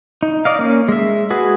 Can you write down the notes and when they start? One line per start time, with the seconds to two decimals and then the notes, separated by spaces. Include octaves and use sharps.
0.23 D#4
0.45 D5 D#5 F5
0.59 A#3 C#4
0.88 G#3 E5
1.30 F#4 G#4 B4